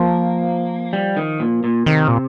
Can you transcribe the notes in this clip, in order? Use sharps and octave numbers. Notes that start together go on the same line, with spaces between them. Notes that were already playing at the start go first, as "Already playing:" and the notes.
Already playing: F3 A#3
G3
D#3
A#2
A#2
C3 D#3
A#2